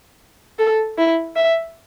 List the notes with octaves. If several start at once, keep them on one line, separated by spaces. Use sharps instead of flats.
A4
E4
E5